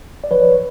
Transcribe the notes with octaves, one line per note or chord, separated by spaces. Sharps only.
D5
F3 B4 C#5